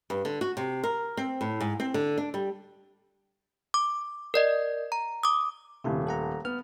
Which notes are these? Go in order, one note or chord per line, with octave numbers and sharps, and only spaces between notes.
G2
D3
F#4
C3
A#4
C4
A2
G#2
C4
D3
D4
G3
D6
A#4 D5 D#5
A#5
D6 D#6
D#1 C3 A3 E4
A4 F#5 A#5
B3 F6